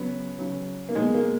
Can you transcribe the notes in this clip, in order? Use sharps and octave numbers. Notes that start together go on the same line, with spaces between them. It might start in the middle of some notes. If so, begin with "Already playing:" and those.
Already playing: C#3 F#3 B3
C#3 F#3
A#3
B2 G#3
A#3